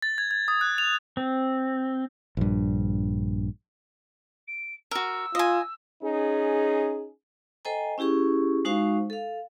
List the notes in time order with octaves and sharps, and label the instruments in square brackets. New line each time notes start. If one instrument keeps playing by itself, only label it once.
[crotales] A6
G#6
G#6
D#6
F#6
F7
[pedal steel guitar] C4
[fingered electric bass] A#1 G2
[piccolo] D7
[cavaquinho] F#4 A#4 [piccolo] E6
[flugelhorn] F4 [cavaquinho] D#5 G#5
[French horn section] C#4 D#4 G#4
[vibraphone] A4 C5 D#5 G5 G#5 A#5
C#4 E4 G4 G#4 C#6
G#3 D#4 F#4 C5 F5 C#6
A4 F5